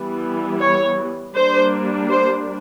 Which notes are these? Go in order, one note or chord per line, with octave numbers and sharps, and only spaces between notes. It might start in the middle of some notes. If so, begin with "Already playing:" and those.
Already playing: E3 G3 B3
C#5
G3 A#3 D4 C5
C5